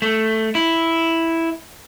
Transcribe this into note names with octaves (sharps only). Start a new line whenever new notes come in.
A3
E4